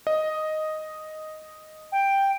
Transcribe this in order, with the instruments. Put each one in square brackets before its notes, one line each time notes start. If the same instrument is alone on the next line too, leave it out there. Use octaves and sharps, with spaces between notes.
[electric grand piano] D#5
[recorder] G5